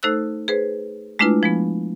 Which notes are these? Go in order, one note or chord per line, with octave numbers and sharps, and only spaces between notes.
A3 D#4 A4 C5 E6 F#6
G#4 B4 C5
G#3 A3 D4 E4 F4 B4
F3 G#3 B3